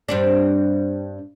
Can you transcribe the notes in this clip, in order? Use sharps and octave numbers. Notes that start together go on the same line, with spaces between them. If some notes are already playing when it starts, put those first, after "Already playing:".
G2 C4 D4